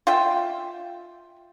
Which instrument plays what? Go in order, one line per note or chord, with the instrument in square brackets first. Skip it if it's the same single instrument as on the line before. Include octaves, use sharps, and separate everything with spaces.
[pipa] F4 E5 G5